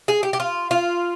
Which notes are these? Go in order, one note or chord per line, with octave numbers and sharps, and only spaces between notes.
G#4
G4
G4
F4
F4